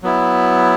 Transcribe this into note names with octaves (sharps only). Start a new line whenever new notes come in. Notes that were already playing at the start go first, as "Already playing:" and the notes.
F#3 B3 E4